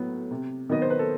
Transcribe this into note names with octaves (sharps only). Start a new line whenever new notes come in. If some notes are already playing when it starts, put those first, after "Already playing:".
Already playing: A2 F#3 B3
C3
D#3 F#3 B3 D#5
C5
B4
A4